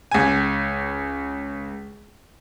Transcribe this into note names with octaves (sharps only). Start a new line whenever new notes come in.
C#2 G#5